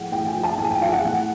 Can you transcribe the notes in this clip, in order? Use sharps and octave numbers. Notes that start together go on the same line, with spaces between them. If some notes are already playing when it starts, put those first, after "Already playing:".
Already playing: A2 F3 F#5 G5
A2 G5
G#5
F3
A5
A2 G#5
G5
F3 F5
F#5
A2